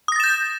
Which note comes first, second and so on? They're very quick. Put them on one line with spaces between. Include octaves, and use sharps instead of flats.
D#6 A#6 A6 E7 G6